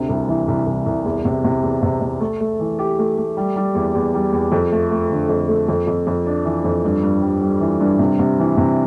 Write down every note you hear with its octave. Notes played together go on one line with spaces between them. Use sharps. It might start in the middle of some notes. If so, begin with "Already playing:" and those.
Already playing: D2 C3
C2
E3
C2
C2
C2
E2
C3
C3
E2
C3
C3
A3
A3
E3
G4
A3
A3
G3
G3
E2
E2
G3
E2
F2
A3
A3
D3
F2
A3
F2
F2
F2
D4
E3
F2
G2
G2
G3
G3
E3
G2
C3
C3
E3
C3